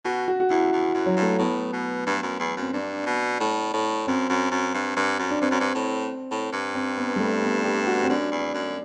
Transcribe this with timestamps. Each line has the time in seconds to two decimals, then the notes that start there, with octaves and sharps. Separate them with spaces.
0.05 B2 F#4
0.28 F#4
0.40 F#4
0.50 E2 E4
0.72 E2
0.94 F#2
1.06 F#3
1.17 G2
1.22 A3
1.39 A2 B3
1.73 B2
2.06 G2
2.23 F#2
2.40 E2
2.57 F#2 C4
2.73 G2 D4
3.06 B2
3.40 A2
3.74 A2
4.07 F#2 C4
4.29 F#2
4.52 F#2
4.74 G2
4.96 G2
5.19 F#2
5.30 D4
5.41 G2 C4
5.51 F#2
5.60 G2
5.75 A2
6.31 A2
6.52 G2
6.75 C4
6.98 B3
7.16 G3
7.20 A3
7.43 B3
7.64 G4
7.87 F#4
8.04 C4
8.09 F#2 D4
8.32 E2
8.54 F#2